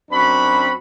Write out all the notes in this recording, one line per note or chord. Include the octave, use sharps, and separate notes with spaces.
F#2 C4 D4 F#4 B5